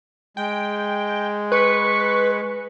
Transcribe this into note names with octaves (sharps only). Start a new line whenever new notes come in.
G#3 G5
B4 C#6